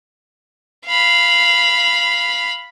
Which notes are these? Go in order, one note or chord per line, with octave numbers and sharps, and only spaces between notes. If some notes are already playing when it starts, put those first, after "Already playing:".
F5 B5